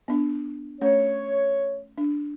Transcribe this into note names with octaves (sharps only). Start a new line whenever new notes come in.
B3 D4
A3 C#4 C#5
D4